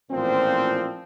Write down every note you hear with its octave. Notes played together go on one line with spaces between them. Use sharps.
A1 A#2 F3 C4